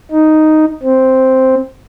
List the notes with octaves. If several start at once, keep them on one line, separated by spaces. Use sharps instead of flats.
D#4
C4